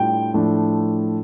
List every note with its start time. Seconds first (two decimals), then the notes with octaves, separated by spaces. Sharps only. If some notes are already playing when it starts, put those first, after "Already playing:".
Already playing: A2 G3 D4 F4 G5
0.34 A2 F3 A3 D4